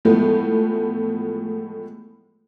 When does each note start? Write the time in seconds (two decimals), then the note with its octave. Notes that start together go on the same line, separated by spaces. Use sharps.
0.05 A2 E3 F3 G#3 A3 B3